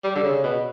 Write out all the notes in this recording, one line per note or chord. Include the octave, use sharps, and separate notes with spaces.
G3
D3
C#3
B2